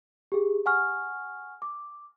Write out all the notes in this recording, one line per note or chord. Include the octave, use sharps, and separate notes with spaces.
G4 G#4
F#5 G#5 C#6 F6
D6